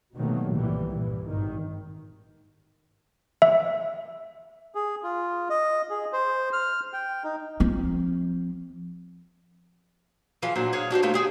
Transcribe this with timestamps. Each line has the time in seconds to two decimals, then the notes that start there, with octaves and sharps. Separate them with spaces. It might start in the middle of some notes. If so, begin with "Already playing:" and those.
0.15 B2 D#3 F#3 G3 A3 A#3
0.52 C2 G2 A#2 E3 G3
0.92 A#1 G2 A#2 E3
1.25 G#1 G2 D#3
3.42 E5
4.75 G#4
5.03 F4
5.50 D#5
5.90 G#4
6.13 C5
6.53 F6
6.93 G5
7.24 D#4
7.60 F3 C4
10.42 E3 F3 F4 G#4
10.55 A#2 F#3 D4 C5
10.73 G#4 C#5 F5 F#5
10.91 D4 F#4 G4 C5
11.03 A3 F4 A#4 C5
11.14 G4 G#4 G5